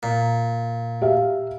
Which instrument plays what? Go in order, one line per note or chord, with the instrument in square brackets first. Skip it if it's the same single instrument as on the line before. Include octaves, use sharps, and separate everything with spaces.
[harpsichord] A#2
[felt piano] G4 E5 F5